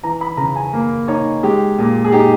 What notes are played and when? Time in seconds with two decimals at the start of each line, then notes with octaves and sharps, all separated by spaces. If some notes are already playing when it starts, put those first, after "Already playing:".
0.03 E3 A#5
0.21 B5
0.37 C#3 A#5
0.56 G#5
0.73 A#3
1.08 D#4 C#5
1.43 G#3 G4
1.78 A#2
2.04 G#4
2.12 D#4 G4